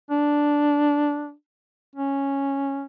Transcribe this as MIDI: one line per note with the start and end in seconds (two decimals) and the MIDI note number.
0.11 1.32 62
1.96 2.85 61